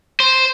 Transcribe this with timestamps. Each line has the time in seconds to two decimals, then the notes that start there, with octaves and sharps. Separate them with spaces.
0.20 C5